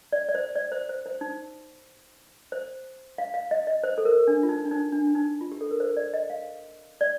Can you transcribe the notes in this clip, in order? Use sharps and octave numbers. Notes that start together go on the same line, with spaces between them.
D5
D5
C5
D5
C5
C5
C5
D#4
C5
F5
F5
D#5
D#5
C5
A4
A#4
D4
F4
D#4
D4
D#4
D4
D4
D#4
F4
G4
A4
A#4
C5
D5
D#5
F5
D5